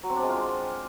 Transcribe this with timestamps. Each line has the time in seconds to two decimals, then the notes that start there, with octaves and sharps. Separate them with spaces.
0.03 F#3
0.10 C4
0.16 D4
0.23 G#3
0.29 F4